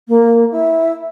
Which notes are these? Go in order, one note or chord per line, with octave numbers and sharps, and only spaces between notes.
A#3
E4